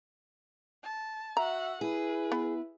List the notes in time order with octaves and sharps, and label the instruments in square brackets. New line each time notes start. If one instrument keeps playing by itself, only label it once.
[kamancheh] A5
[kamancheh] F#4 F#5 [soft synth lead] E5 [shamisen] A#5
[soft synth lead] E4 [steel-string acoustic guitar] G#4 [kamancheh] B4
[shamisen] B3